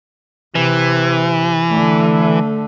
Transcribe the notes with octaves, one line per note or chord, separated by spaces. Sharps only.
C3 E3
D3 A3